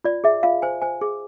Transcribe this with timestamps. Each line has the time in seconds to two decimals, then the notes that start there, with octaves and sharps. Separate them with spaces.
0.04 F4 D5
0.24 G#4 E5
0.43 F4 F5
0.62 C5 G#5
0.82 C5 G#5
1.01 G#4